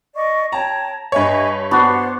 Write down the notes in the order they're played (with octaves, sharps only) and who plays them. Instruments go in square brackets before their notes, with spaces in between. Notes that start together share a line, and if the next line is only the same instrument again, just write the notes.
[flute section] D5 D#5 C#6
[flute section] C#5 G5 [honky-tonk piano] A5 A#5
[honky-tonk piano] G2 C#5 [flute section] D#5 E5 G#5
[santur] B3 D4 F#4 [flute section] C5 F#5 C6